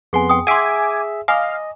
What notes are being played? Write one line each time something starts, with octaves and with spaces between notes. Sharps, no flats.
F2 B3 G#4 G#5 C6
G5 D#6
G#4 E5 F#5 G#5 C6 D6
D#5 F5 G#5 B5 D6